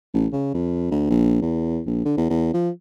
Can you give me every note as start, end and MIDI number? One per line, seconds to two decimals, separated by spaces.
0.14 0.27 33
0.33 0.50 49
0.54 0.90 41
0.91 1.10 38
1.10 1.39 34
1.42 1.81 40
1.86 2.03 34
2.05 2.17 50
2.17 2.26 40
2.30 2.49 40
2.54 2.70 53